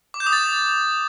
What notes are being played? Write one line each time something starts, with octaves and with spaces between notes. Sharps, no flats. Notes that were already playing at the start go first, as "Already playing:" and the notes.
D6
G6
D#6
A6